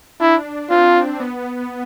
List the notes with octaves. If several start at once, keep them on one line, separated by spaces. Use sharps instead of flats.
D4 E4
C4 F4
B3